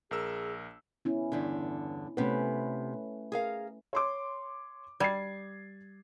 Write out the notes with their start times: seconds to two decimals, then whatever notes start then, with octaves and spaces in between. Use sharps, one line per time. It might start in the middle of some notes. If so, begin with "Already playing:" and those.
0.11 A#1 G#4 A#4 E6
1.05 B3 C#4 E4
1.32 E2 G2 D3
2.17 C3 A3 B3 C#4 B4
3.32 G#4 A#4 F5
3.93 C#5 C6 D6
5.00 G3 G#6 A6 C7